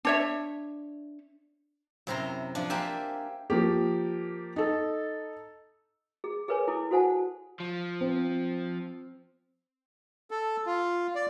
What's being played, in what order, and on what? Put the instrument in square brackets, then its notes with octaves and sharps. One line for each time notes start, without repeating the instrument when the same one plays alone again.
[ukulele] D4 C#5 E5
[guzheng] F#2 C3 E4 A#5 C6
F3 D4
A#3 G4 C5 E5 G#5
[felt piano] F3 A#3 G4
D#4 A4
[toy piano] G#4
G#4 A#4 B4 C#5 G#5
E4 A4 D6
F#4 A4 C5 F#5 G#5 A5
[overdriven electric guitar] F3
[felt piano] C4
[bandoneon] A4
F4
D5